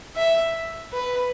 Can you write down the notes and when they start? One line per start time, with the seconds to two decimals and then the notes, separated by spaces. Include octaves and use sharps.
0.16 E5
0.93 B4